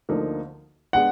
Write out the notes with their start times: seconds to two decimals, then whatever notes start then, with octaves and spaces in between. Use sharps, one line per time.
0.09 D2 D3 F3 A#3 D#4
0.93 G#3 B3 D4 F#5